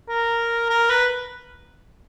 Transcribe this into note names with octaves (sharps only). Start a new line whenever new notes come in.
A#4
A#4
B4